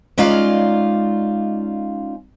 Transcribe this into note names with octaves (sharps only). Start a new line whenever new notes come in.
G#3 C#4 D#4 F4 D5 F5